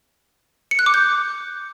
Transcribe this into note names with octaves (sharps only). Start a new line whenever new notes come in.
C#7
F#6
D6
G6